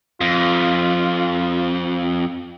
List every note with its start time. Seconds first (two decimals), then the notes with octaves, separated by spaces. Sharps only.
0.21 F2 F4